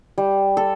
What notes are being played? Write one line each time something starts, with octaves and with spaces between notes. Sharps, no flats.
G3
A4